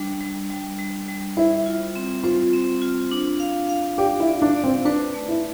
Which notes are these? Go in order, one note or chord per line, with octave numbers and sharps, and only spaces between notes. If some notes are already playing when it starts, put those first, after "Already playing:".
Already playing: G3 D4
G3
G3
G3
G3
E4 C5
F4
C4
F4 C5
C4
F4
D4
F5
F5
G4 D5
E4
D5
D4
D5
C4
D4 B4
A3
E4